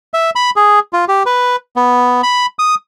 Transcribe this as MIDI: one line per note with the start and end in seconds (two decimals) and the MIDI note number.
0.14 0.30 76
0.36 0.50 83
0.56 0.79 68
0.93 1.05 65
1.08 1.23 67
1.26 1.56 71
1.76 2.21 59
2.23 2.46 83
2.59 2.75 87